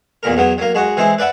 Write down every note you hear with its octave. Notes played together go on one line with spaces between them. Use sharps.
E2 A#2 A#4
E2 F#3 B3
F#3 A#3
G#3 F#4 F#5
E3 G#3 C4 E4
B4 D5 E5 F#5